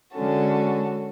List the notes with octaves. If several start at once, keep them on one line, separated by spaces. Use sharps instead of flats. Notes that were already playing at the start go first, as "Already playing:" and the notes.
D3 G#3 C#4 F#4 A4